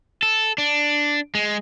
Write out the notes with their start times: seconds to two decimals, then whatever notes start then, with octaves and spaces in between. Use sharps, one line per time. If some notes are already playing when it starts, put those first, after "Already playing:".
0.23 A4
0.58 D4
1.35 G#3